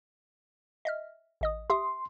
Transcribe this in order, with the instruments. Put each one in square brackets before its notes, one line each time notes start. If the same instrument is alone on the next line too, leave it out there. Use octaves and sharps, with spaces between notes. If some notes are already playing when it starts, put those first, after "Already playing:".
[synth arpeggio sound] D#5 E5 F6
A1 D#5 D#6
[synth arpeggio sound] G4 E5 D#6 [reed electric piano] C6